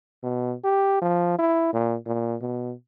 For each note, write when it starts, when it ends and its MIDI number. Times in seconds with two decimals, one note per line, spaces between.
0.23 0.54 47
0.64 1.01 67
1.02 1.37 53
1.38 1.70 64
1.73 1.96 46
2.06 2.36 46
2.41 2.73 47